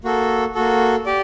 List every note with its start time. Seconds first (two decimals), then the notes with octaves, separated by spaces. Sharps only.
0.04 A#3 F#4 A4
0.55 A#3 F#4 A4
1.06 G4 D5